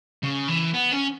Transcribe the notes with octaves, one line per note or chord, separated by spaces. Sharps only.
C#3
E3
B3
C#4